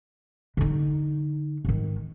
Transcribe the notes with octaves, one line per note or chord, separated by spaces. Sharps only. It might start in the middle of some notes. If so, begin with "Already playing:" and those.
D3 D#4
G#2 D#3